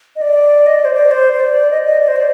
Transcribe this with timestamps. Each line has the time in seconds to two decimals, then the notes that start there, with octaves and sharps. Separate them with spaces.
0.16 D#5
0.22 D5
0.66 D#5
0.75 D5
0.85 C5
0.93 D5
1.11 C5
1.33 C5
1.40 D5
1.71 D#5
1.85 D#5
2.00 D5
2.08 C5
2.16 D5